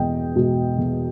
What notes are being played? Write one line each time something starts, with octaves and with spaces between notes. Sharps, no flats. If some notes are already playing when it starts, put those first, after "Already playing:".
Already playing: E2 B2 G#3 D#5 G5
B2 G#3
E2